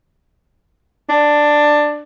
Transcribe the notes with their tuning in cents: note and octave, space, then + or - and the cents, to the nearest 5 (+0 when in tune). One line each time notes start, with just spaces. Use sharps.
D4 +10